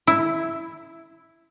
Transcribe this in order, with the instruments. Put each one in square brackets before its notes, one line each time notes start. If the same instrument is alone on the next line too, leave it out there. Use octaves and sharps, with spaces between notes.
[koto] E4